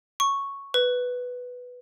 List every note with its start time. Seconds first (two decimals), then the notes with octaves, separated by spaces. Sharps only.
0.20 C#6
0.74 B4